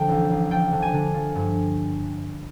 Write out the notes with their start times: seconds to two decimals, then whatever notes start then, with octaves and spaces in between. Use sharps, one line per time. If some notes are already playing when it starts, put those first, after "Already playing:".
Already playing: D3 F3 G5
0.08 A1
0.30 A1
0.51 F3 G5
0.72 D3
0.82 G#5
0.93 D3
1.14 F3
1.35 G2